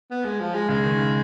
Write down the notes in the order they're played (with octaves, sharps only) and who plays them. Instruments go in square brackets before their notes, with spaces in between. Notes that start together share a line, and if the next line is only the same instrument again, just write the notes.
[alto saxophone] B3
G#3
F3
G#3
[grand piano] C#3 [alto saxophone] G#3
[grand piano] D#3
C#3